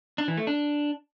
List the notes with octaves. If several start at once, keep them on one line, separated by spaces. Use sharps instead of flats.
D4
E3
A3
D4